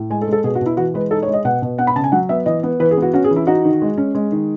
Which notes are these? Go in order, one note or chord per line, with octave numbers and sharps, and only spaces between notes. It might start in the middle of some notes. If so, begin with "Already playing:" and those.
Already playing: A2
G#3 G#5
A4
G#3
A4
B2 G#4
F#4
B2 E4
E3 F#4
G#3 B4
D#4 A4
C#5
G#3
D#5
B2 F#5
B2
B3 F#5
B5
C#3 A5
G#5
F#3 F#5
B3 E5
E3 D#5
B3
E3 B4
G#4
B3
F#4
C#4 F#4
G#4
E3
E4
D#4 F#4
D#3
G#3
C#4
G#3
D#3